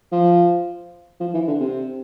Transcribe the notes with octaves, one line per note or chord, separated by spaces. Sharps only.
F3
F3
E3
D3
C3